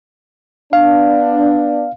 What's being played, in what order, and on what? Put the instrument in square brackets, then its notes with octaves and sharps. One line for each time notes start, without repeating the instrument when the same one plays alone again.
[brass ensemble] B3 D4 [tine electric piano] F5